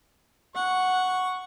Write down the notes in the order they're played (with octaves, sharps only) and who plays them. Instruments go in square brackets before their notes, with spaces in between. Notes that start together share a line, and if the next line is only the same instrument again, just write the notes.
[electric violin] F#5 [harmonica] C#6